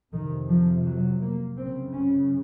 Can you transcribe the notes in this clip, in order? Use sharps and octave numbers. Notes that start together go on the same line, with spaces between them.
F2 C3 D#3
F3
F#3
A#3
F#2 C#3 C4
C#4